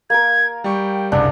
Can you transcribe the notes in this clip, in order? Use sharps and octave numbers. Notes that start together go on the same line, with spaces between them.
A#3 A#4 G#6
G3 G5 C#6
F#1 C2 G2 D4